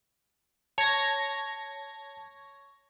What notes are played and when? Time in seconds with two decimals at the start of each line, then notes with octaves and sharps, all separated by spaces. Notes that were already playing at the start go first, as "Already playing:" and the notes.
0.78 C#5 A5 G#6 A#6